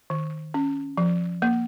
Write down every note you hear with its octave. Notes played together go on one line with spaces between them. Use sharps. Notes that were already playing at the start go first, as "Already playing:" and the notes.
D#3
C#4
F3
A#3